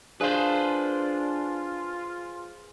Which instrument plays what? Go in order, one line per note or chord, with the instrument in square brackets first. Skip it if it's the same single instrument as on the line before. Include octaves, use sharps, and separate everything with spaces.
[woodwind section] D4 [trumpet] F4 [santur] G#4 F5 [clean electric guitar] B4 C5